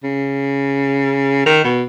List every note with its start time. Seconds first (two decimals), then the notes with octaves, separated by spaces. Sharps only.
0.03 C#3
1.46 D#3
1.64 B2